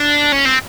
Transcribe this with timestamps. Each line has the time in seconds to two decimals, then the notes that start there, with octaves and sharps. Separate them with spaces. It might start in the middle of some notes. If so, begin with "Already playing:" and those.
Already playing: D4
0.32 C#4
0.45 C4